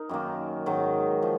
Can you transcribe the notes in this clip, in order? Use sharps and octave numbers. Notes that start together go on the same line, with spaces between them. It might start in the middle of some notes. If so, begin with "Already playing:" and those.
Already playing: D#4 A#4
F#2 D#3 A#3
G#2 D#3 F#3
F3